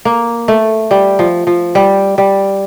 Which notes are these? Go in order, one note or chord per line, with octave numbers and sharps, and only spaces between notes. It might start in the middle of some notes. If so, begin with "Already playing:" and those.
A#3
A3
G3
F3
F3
G3
G3